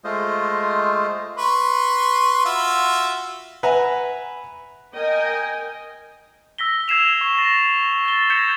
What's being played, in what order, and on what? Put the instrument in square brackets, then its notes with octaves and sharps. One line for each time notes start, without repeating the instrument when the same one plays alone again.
[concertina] G#3 A3 F4 C5 D#5
[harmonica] B4 C6 C#6
F4 F#4 E5
[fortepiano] B4 E5 F#5 G#5 A#5
[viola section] A#4 D#5 G5 G#5
[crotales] E6 A#6 B6 G7
E6 G#6 C7 E7 F7
C#6
A6 A#6 D#7 F#7
A6 G7
G6 G#6 A#6 B6 C#7 E7